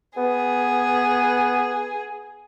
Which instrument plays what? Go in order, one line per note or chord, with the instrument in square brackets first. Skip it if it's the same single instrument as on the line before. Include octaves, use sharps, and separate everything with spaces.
[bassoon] B3 [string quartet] G#4